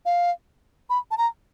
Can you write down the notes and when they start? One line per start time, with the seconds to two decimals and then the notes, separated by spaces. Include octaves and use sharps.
0.05 F5
0.90 B5
1.11 A5
1.18 A#5